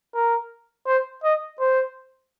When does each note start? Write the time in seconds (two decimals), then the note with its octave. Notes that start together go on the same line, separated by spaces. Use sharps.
0.14 A#4
0.87 C5
1.24 D#5
1.60 C5